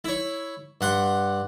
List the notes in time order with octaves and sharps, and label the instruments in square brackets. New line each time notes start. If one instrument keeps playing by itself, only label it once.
[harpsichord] E4 C#5
G2 F#5 C6